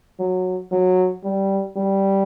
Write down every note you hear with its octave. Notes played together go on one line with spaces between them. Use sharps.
F#3
F#3
G3
G3